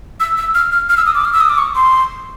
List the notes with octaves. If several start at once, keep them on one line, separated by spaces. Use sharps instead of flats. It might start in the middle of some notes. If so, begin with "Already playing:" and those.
E6
E6
F6
F6
F6
E6
D#6
D6
F6
E6
D#6
D6
C#6
C6